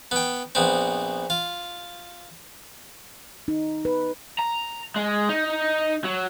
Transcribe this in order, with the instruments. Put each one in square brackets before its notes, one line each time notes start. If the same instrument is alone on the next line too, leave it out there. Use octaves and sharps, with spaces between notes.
[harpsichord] B3 G5
A#1 B3 C4
F4
[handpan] D#4
B4
[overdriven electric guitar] A#5
G#3
D#4
F#3